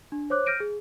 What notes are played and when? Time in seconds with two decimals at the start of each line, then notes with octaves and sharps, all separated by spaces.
0.12 D4
0.30 C5 C#5 D6 F#6
0.46 F6 G6 A#6 D7 D#7
0.60 G#4